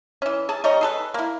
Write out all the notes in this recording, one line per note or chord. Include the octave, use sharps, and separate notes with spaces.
E3 C#4
G#4 A5
G3 D#4 C#5 D#5
G#4 A4 B4
A#3 E4